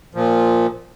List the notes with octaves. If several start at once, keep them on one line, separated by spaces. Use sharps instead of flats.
A#2 F3